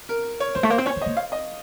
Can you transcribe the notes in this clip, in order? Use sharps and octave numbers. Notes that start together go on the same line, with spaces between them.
A#4
C#5
F#3 C5
A3
A#3 C5
C4
C#4 C#5
C4
D#5
A#3
F5
D#5